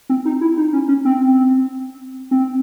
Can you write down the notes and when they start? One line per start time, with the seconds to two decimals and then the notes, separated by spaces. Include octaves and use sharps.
0.09 C4
0.25 D#4
0.41 E4
0.58 D#4
0.73 C#4
0.88 C#4
1.05 C4
2.31 C4